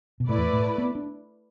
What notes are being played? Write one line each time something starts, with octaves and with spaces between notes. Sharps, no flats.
B2
A2 A3 E4 B4 D5
E2
A2
B3
D4